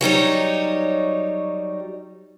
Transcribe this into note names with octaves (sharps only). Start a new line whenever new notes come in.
F#3 G3 D#4 C#5